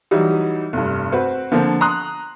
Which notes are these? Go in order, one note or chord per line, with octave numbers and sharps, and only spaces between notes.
E3 F#3 G3 D#4
F1 G2
C4 F#4 B4
D3 F3 A#3 C4
A#5 C6 D#6 F#6